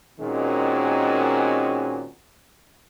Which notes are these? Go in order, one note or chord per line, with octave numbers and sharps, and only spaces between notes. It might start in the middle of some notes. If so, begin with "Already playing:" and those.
A#2 D#3 G#3 C4 C#4 F#4